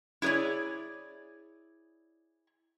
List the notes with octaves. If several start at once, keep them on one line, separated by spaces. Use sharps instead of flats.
E4 G#4 B4 C#5 D5